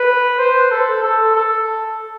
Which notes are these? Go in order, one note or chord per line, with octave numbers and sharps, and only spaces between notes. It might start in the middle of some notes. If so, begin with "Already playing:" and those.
Already playing: B4
C5
A4
A4
A4